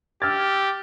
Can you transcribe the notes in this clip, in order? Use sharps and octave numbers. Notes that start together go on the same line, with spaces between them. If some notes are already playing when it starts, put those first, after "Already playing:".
G4 E6 F6 A6